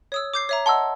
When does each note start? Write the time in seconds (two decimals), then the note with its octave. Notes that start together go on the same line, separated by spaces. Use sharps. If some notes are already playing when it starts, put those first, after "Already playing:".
0.12 C#5 D#6 E6
0.34 D6 G6 C7
0.49 C#5 E5 A#5
0.66 D#5 F#5 A5 C6 E6